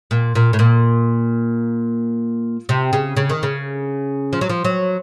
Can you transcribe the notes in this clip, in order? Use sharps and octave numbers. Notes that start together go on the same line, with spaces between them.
A#2
A#2
A2
A#2
C3
C#3
C#3
D#3
C#3
F3
F#3
F3
F#3